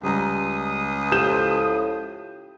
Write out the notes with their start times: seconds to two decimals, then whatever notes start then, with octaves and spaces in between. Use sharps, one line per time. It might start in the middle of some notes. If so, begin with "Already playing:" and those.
0.03 C#2 G3 A#5 D#6
1.12 A2 F3 G4 G6 E7